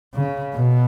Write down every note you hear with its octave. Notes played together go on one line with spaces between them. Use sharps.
C#3
B2